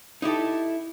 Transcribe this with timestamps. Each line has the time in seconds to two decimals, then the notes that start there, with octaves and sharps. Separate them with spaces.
0.22 D#4 E4 G4 A4